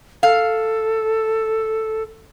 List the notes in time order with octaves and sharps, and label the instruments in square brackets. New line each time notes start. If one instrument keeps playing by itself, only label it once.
[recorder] A4 [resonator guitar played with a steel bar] F5